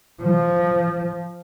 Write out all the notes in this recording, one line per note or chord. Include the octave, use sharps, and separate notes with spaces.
F3